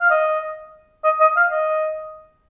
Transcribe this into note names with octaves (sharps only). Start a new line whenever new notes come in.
F5
D#5
D#5
D#5
F5
D#5